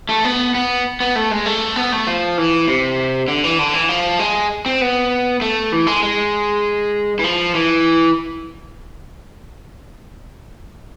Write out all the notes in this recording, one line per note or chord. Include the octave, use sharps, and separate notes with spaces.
A3
B3
B3
B3
A3
G#3
A3
B3
A3
F3
E3
C3
D3
E3
D3
E3
F3
G#3
C4
B3
A3
E3
G#3
G#3
E3
F3
E3